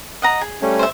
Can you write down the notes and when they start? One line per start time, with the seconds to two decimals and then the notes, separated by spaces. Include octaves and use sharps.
0.22 D#5 F#5 A#5
0.41 G#4
0.62 G3 A3 C#4
0.79 C5 E5